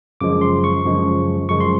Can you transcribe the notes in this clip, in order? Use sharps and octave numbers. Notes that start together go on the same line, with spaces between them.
F#2 C#3 F3 G#3 D6
C6
C#6
F#2 C#3 F3 G#3
F#2 C#3 F3 G#3 C#6
C6